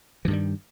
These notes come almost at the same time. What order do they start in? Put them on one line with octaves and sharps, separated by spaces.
E3 G2 D#3 G3